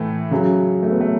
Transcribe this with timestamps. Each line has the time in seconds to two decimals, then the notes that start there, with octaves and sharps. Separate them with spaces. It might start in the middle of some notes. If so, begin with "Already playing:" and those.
Already playing: A2 E3 A3
0.31 C#3 F#3
0.83 A3
0.91 B3
1.01 A3